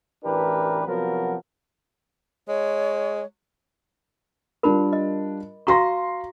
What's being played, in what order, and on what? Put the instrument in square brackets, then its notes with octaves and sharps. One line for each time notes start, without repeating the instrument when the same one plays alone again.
[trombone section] A1 E3 D4 G4 A#4 B4
C3 F3 F#3 B3 F#4 A#4
[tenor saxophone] G#3 [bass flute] C#5
[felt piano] G3 D4 F4 [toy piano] A#4 B5
[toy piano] D#5
[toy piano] F#4 A#5 C#6 [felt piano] F5 C6 A#6